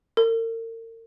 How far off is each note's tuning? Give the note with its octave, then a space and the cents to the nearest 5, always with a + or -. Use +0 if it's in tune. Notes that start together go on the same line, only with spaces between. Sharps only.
A#4 -40